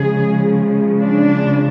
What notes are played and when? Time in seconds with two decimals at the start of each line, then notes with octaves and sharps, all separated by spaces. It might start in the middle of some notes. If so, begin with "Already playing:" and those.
Already playing: C#3 F3 G#3 G#4
0.99 D4